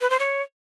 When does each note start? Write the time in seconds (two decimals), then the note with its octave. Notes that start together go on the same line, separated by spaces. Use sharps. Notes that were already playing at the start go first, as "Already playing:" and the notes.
0.01 B4
0.10 C5
0.19 C#5